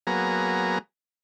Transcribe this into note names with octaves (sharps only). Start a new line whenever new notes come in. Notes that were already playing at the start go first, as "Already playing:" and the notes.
F#3 A#3 B3 G#4 A#5